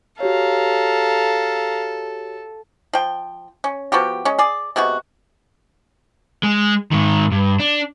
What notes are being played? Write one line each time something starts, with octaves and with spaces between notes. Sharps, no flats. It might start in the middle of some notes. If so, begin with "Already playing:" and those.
F#4 G4 A4 C#5 F5 A#5
F3 G5
C#4
F3 B3 F#4 G4
G#3 C#4
G#4 D5
C3 G#3 B3 F#4
G#3
G#2 D#3
G2
D4